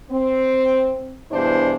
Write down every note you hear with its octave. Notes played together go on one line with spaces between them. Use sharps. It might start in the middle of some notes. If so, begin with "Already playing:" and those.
C4
E2 G2 B2 D4 E4 C5